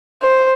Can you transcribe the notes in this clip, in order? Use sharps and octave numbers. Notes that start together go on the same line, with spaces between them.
C5